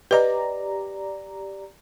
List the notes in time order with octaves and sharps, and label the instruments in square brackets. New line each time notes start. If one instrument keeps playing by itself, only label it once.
[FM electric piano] G4 D5 A#5 [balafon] B4 D#5